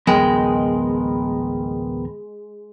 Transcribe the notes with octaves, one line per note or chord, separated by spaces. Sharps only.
A1 D2 F#3 G#3 B3 A#4 G5